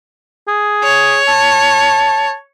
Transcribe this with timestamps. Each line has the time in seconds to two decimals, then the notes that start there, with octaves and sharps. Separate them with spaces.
0.48 G#4
0.84 C#5
1.28 A5